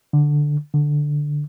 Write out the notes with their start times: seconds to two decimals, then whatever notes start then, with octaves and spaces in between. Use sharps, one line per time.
0.13 D3
0.74 D3